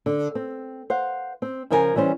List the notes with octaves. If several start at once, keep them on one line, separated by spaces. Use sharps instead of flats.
D3
C4
C5 F5 F#5
C4
C#3 F3 E4 F4 A#4 G#5
E3 G3 C#4 C5